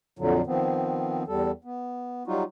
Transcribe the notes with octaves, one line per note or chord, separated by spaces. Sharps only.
F2 A#2 D3 F#3
D#3 F3 B3 C4
E2 G3 A4
B3
F#3 G3 D#4 F4 F#4